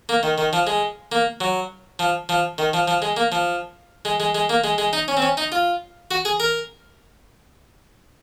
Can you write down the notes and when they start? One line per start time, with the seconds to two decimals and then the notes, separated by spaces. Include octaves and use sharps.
0.09 A#3
0.23 D#3
0.38 D#3
0.53 F3
0.67 G#3
1.12 A#3
1.40 F#3
1.99 F3
2.29 F3
2.58 D#3
2.73 F3
2.88 F3
3.02 G#3
3.17 A#3
3.32 F3
4.05 G#3
4.20 G#3
4.35 G#3
4.49 A#3
4.64 G#3
4.78 G#3
4.93 D#4
5.08 C#4
5.17 C4
5.22 C#4
5.37 D#4
5.52 F4
6.11 F#4
6.25 G#4
6.40 A#4